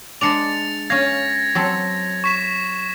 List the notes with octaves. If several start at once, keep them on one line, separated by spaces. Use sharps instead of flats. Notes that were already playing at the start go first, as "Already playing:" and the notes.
G#3 D4 D5 A6 C#7 F7
C#4 F5 G#6 A#6
F#3 C4 A4
C#6 B6 E7